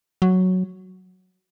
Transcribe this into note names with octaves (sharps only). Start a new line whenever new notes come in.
F#3